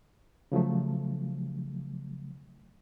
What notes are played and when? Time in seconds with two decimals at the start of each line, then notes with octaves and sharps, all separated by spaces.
0.52 C#3 F3 F#3 A3